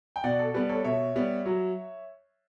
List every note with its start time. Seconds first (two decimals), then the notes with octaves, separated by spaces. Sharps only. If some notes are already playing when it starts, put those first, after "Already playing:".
0.16 G5
0.24 B2 D5 F#5
0.39 A4
0.54 G3 B3 B4
0.69 A4 C#5
0.84 B2 C#5 E5
1.15 G3 B3
1.46 F#3